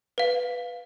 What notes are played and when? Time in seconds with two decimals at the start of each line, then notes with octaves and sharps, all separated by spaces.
0.18 B4 F5